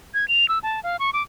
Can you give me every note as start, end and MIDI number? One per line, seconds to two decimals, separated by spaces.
0.14 0.28 92
0.28 0.48 101
0.49 0.59 88
0.63 0.82 81
0.83 0.97 77
0.99 1.10 85
1.13 1.23 86